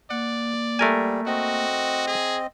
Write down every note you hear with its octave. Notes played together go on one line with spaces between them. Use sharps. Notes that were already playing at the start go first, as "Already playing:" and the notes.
A#3 D5 F#5
G3 A3 A#4 G#5
C4 F#4 D#5
G#4